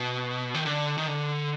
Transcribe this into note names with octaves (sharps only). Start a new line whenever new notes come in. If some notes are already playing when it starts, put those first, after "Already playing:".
Already playing: B2
D#3
D3
D#3
D3